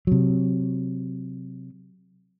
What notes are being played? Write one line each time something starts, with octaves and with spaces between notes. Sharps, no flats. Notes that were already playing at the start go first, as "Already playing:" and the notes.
C3 F#3